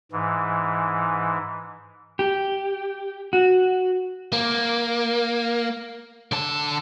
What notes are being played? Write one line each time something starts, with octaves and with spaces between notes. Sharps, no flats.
G#2 E3
G4
F#4
A#3
D3 A5